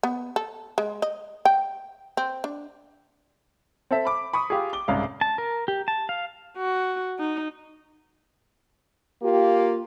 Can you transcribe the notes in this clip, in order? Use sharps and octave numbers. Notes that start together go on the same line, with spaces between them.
B3
A4
G#3
D#5
G5
C4
D4
C4 A4 E5
B5 D6
B5 C#6 D#6
F4 G4 G#4
D6 G7
C2 G#2 C#3 G#4 F5
A5
A#4
G4
A5
F5
F#4
D#4
A#3 F4 G4